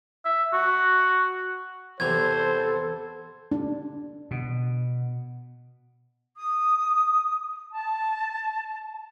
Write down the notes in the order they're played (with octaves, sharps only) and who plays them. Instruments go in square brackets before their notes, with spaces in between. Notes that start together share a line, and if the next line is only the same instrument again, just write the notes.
[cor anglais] E5
F#4
[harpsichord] E2 C3 E3 [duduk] A4 [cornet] C5 [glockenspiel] G#6
[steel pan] D4
[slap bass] B2
[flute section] D#6
A5